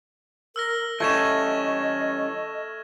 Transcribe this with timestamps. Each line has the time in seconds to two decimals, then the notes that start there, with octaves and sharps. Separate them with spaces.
0.56 A#4 E6 F6 A#6
1.00 E3 G3 A3 C#4 D#5 C#6 G#6 E7